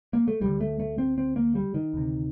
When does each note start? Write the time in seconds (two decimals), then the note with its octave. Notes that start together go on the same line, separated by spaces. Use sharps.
0.13 A#3
0.28 A3
0.41 D2 D3 G3
0.61 A3
0.80 A3
0.98 C4
1.18 C4
1.36 A#3
1.55 G3
1.74 D#3
1.94 D2 C3